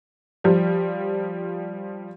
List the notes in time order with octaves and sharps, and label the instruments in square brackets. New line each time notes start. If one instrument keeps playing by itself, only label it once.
[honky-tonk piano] F3 G3